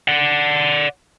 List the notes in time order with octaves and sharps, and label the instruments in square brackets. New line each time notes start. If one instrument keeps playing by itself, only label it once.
[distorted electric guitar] D5 F#5